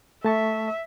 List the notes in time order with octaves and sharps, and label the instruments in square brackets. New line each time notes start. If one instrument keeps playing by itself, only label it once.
[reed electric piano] A3 A5 C#6 [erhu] E5